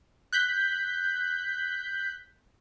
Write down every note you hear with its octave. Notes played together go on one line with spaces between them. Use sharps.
F#6 G6 B6